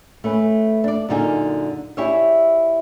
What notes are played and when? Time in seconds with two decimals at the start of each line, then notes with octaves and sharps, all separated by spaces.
0.24 A3 C#4 B4
0.84 D4 D5
1.09 F#2 A#2 D3 D#4 G#4
1.97 E4 G4 G#4 C#5 D5 E5